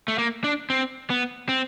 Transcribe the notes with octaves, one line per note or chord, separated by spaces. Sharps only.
A3
A#3
D4
C4
B3
C4